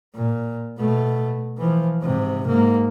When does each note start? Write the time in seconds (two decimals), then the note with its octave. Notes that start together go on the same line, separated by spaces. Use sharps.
0.15 A#2
0.78 B2 A3
1.58 E3 F3
2.02 G#2 C3
2.46 G#2 A#3